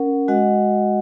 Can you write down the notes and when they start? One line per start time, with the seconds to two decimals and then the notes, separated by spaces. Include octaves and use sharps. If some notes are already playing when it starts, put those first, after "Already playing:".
Already playing: C#4 A#4 F#5
0.28 G#3 F#4 D#5 F#5